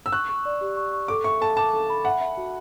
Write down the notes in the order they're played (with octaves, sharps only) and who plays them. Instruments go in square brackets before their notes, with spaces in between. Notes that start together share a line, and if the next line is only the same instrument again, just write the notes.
[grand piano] E6
[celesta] C#6 [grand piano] F#6
[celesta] C#6
D5
G4
C#6
C#6
[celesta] A4 [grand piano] D6
[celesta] E5 [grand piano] C#6
[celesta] A4 [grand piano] A5
[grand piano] A5 [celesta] D6
[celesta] A4
B5
[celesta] E5 [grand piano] F#5
[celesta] E5
F#4